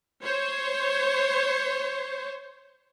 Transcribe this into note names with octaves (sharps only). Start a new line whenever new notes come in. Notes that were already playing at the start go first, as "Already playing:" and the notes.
C5 C#5